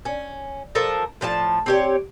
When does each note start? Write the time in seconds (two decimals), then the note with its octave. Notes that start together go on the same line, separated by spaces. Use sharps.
0.05 C#4
0.75 F3 A4 A#4 A5
1.21 A2 F3 G4 A5
1.66 C4 G4 C#5